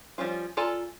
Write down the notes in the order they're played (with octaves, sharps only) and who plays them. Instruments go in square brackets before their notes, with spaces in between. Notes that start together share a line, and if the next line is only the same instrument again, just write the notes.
[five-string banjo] F3 G3 C#4 F4
F4 A4 D5 G#5 A#5